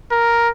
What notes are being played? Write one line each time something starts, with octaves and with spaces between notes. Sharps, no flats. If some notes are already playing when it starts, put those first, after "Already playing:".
A#4